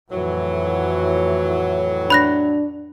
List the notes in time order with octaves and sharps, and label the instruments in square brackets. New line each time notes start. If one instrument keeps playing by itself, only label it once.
[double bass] F2 E3 [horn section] A2 F#3
[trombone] D4 [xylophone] B5 F#6 A#6